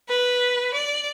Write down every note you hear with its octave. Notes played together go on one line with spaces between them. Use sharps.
B4
D5